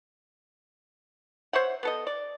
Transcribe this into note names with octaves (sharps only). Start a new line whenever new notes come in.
C5 C#5 E5 F#5
B3 A4 D#5
D5